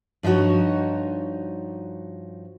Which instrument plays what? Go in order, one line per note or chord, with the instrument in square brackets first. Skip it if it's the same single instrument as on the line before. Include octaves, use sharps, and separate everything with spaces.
[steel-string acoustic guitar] G2 F3 D#4 F#4 C#5